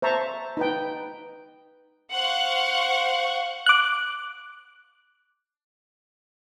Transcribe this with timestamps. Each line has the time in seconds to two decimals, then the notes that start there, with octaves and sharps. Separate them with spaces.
0.02 C5 E5 A5 A#5 C#6
0.57 D#4 B4 G5
2.12 C5 F5 F#5 C#6
3.66 D6 F#6